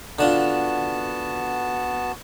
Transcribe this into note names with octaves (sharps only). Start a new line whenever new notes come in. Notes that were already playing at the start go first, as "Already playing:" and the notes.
D3 B3 D4 F4 F#4 A5